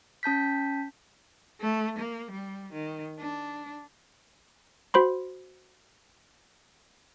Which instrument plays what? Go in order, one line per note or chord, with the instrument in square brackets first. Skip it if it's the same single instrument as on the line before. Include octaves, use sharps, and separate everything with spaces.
[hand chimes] C#4 A5 G6 B6
[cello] A3
A#3
G3
D#3
D4
[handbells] F#4 C5 B5 C6